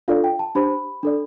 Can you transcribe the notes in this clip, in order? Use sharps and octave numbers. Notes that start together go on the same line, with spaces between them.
D4 F4 A4 D5 F5
G5
A5
D4 G4 C5 B5
D4 A4 D5